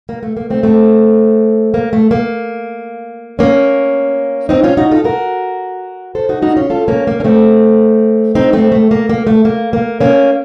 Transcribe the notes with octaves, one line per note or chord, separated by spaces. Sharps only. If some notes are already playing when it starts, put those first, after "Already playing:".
A#3
A3
A#3
A3 C4
A3 C4
A#3
A3
A#3
A#3 C#4
C4 D#4
C#4 F4
D#4 F#4
F4 A4
F#4 A#4
A4 C5
D#4 F#4
D#4 F#4
C#4 F4
F4 A4
A#3 C#4
A#3
C#4
A3 C4
C4 D#4
A3 C4
A3
A#3
A#3
A3
A#3
A#3
A#3 C#4